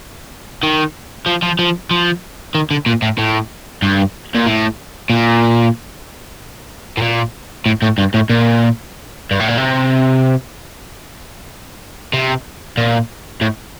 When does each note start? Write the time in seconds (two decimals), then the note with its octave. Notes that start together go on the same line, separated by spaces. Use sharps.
0.63 D#3
1.26 F3
1.42 F3
1.59 F3
1.91 F3
2.55 D#3
2.71 D3
2.86 A#2
3.02 A2
3.18 A2
3.82 G2
4.35 A#2
4.46 A2
5.10 A#2
6.97 A2
7.02 A#2
7.66 A2
7.82 A2
7.98 G2
8.14 A2
8.30 A#2
9.31 G2
9.40 A2
9.48 A#2
9.58 C3
12.13 C3
12.77 A#2
13.41 A2